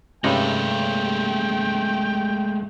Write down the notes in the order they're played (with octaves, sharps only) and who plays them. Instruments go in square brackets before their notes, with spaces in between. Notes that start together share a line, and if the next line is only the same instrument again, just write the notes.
[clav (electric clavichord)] G2 C3 D#4 [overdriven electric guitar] G#3 A3 [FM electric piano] C#4 G4 [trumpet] G5